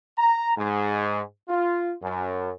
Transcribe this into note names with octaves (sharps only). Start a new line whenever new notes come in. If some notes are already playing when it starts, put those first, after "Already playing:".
A#5
G#2
F4
F#2